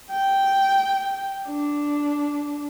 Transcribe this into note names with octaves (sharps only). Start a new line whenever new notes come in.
G5
D4